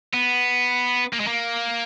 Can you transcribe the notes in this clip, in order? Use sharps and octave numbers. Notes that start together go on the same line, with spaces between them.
B3
A#3
G#3
A#3